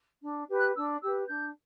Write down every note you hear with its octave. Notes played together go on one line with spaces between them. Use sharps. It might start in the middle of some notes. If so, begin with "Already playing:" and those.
D4
G4 B4
F#6
D4 E6
G4 B4 E6
D4 G6